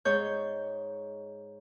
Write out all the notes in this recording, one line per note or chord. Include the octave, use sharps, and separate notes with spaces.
G#2 C#5 G6